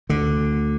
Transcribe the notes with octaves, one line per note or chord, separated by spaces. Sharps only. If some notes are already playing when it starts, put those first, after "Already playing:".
D2 D3